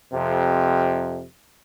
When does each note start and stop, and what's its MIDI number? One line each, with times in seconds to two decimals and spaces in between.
0.13 1.23 41
0.13 1.23 48